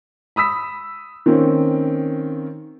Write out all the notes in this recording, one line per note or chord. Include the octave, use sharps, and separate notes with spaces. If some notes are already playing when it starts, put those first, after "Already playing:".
B5 D#6 E6 B6
D#3 A#3 C4 C#4